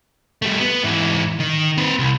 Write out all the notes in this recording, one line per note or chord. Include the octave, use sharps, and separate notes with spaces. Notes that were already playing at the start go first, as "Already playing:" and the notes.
G3 A3
B3
G#2 E3
D#3
C4 B4
C2